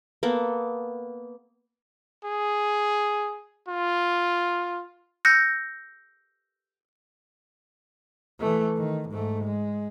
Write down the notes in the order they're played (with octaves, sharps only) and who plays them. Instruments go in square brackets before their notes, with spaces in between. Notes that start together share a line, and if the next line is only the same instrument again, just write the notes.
[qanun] A#3 B3 A4
[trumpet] G#4
F4
[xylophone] E6 F#6 G6 A#6 C#7
[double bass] E3 A3
D#3
G#2 A3
G#3